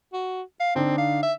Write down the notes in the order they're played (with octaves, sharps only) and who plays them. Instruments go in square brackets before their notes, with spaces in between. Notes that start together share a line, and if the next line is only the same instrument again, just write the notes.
[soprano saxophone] F#4
F5
[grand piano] D3 D4 D#4 [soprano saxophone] C4
[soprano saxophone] F5
E5